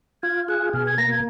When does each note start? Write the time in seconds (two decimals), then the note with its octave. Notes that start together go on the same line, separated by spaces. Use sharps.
0.23 F4 G#6
0.48 G#4 F#6
0.73 B2 F6
0.87 G#6
0.98 A#3 A#6
1.11 G#6